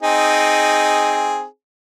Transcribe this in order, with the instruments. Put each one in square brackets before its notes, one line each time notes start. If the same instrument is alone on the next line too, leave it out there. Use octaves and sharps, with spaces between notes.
[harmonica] C4 D#4 G#4